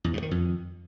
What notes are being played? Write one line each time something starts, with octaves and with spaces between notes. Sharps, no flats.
E2
G2
D#3
F2